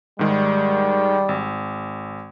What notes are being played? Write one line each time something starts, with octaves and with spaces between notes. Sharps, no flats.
G#2 D#3 G3 G#3
G#1